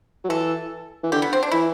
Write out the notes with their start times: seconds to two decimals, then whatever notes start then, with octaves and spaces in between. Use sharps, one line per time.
0.24 F#3
0.29 E3 A4
1.03 E3
1.12 D3 G4
1.22 B3
1.33 C4
1.43 D4
1.52 E3 E4